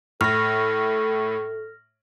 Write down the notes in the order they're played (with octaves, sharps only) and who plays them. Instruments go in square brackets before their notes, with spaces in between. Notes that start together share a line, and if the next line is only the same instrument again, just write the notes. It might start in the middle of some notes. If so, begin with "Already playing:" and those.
[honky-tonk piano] A2 [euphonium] A4 [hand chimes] F6 A#6